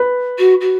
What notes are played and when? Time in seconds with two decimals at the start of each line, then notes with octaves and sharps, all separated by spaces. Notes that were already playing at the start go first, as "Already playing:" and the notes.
Already playing: B4
0.38 F#4
0.60 F#4